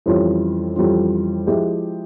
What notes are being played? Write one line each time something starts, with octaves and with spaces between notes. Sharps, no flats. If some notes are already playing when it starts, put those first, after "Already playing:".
F2 E3 G3 C#4 F4
F2 E3 G3 C#4 F4
F3 G#3 E4 G4